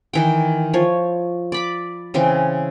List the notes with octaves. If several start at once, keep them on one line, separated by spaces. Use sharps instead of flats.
D#3 E3 G5
F3 C#5
D5 B5 D6
C#3 E3 C4